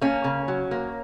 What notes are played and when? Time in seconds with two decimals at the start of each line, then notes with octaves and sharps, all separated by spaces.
0.01 A#3 C#4
0.24 C#3
0.48 F#3
0.71 A#3